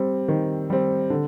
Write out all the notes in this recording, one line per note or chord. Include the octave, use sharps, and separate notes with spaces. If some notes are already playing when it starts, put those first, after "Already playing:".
Already playing: G3 C4
D#3
G3 C4
D3